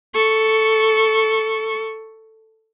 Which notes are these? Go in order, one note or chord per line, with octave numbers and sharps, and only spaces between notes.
A4 C#6